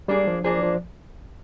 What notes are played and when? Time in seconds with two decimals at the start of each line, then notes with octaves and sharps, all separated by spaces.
0.08 G3 A#3 D4 G#4
0.27 F3
0.44 F3 A#3 D4 G#4
0.63 F3